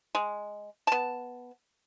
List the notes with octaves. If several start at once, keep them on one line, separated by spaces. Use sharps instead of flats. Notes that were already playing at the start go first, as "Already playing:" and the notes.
G#3
B3 A5